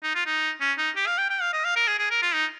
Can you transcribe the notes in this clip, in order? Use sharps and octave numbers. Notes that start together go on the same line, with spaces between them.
D#4
F4
D#4
C#4
D#4
G4
F5
G5
G5
F5
D#5
F5
A#4
G#4
G#4
A#4
F4
D#4